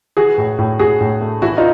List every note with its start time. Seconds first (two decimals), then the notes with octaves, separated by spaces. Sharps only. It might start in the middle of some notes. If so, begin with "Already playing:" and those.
0.17 E3 F#4 G#4
0.38 A2
0.58 A2
0.79 A2 F#4 G#4
1.00 A2
1.21 A3
1.42 E3 E4 F#4
1.57 D#4 F4